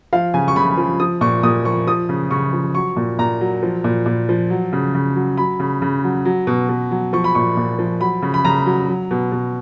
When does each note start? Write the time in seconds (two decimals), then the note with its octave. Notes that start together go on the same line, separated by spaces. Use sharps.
0.13 F3 F5
0.34 C#3 G#5
0.48 C#6
0.56 C#3 B5
0.77 F3
1.00 F3 D#6
1.21 A#2 C#6
1.43 A#2 D#6
1.65 F3 C#6
1.87 F3 D#6
2.09 C#3
2.31 C#3 C#6
2.53 F3
2.75 F#3 C#6
2.96 A#2
3.19 A#2 A#5
3.41 F#3
3.63 F3
3.84 A#2
4.06 A#2
4.29 F3
4.50 F#3
4.73 C#3
4.94 C#3
5.16 F#3
5.37 F#3 B5
5.60 C#3
5.82 C#3
6.04 F#3
6.25 F#3
6.47 B2
6.69 B2
6.91 F#3
7.13 F3 C#6
7.24 B5
7.35 A#2 C#6
7.57 A#2
7.79 F3
8.01 F#3 B5
8.22 C#3
8.34 B5
8.45 C#3 A#5
8.66 F#3
8.88 F#3
9.11 B2
9.32 B2